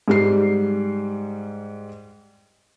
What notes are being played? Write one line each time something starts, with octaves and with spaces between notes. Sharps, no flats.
G#2 G3 C7